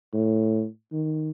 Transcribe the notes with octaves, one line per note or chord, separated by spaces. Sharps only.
A2
D#3